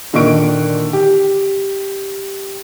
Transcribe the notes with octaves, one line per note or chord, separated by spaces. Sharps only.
A#2 D3 D#3 D#5 C#6 D7
G4